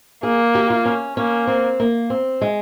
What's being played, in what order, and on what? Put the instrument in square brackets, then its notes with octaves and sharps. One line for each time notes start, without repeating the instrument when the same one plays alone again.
[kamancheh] A#3 [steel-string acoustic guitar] G#4
[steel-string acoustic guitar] G4
F4
C#4
[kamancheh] A#3 [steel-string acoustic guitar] C#4
[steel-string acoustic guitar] C4
A#3
C4
G#3